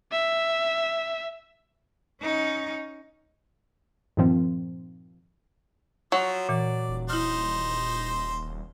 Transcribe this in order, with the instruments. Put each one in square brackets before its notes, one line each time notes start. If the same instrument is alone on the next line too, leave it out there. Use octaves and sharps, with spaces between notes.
[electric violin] E5
[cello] C#4 D#4
[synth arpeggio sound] G2 A#2 D#3 F3 C4
[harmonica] F3 [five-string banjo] F#3
[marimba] A#2 E3 [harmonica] D5
[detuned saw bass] D#1
[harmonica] D#4 C5 [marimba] E4 F6